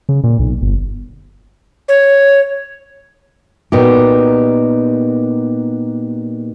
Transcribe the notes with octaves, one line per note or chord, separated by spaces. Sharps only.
C#3
A#2
B1
G1
C#5
A#2 B3 D#4 F#4 G4